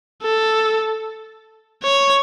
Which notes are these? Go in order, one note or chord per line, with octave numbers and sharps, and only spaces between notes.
A4
C#5